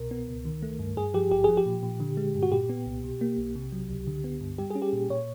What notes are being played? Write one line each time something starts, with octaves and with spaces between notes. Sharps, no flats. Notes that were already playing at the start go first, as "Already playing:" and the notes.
Already playing: C2 B2 A#4
B3
C#2
D#3
A3
G2
G2 G#4
F3 G4
G#1 G4
F3 G#4
G4
A#2
A#2
D3
G#3
G2
F#4
A#2 G4
B3
C2
B2
A#3
B1
C3
F#3
C#2
D3
B3
G2
G3 G4
C#4 G#4
G4
A#2
A#2 C#5